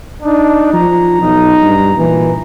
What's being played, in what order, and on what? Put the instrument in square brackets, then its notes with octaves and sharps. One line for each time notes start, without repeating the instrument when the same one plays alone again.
[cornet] D4 [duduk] D#4
[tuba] F3 [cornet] A#5
[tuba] B1 [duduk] D#4
[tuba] G2
[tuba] A#2 [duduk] E3